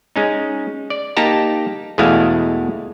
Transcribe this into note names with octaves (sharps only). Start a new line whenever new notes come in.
G#3 C#4 D#4
D5
A#3 D#4 G4 A5 A#5
E2 B2 G#3 A3 E4 F5